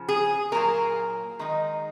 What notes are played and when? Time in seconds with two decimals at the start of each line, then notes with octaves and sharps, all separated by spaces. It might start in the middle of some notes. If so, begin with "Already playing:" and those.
Already playing: C#3 F3
0.09 G#4
0.52 A#2 F#3 A#3 A#4
1.39 D#3 G#3 D#4